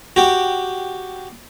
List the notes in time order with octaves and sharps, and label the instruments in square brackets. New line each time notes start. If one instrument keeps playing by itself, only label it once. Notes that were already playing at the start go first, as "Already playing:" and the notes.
[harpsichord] F#4 G4